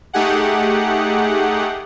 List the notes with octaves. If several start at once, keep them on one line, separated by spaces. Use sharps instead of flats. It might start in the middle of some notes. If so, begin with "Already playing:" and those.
A3 D#4 G4 G#4 F#5